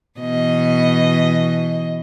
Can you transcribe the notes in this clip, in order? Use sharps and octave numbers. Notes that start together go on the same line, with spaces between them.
B2 E3 D#5